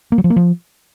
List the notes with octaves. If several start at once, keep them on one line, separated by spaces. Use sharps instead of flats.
A#3
F#3
F3
A#3
F3